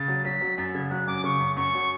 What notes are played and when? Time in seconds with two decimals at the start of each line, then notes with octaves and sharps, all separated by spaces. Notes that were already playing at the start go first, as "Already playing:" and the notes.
Already playing: C#3 A6
0.08 F#3
0.25 F#3 B6
0.41 F#3
0.58 F#2 A6
0.74 C#3 G#6
0.90 F#3 F#6
1.07 F#2 D6
1.24 C#3 C#6
1.40 F#2
1.56 F#2 C#6
1.74 F#3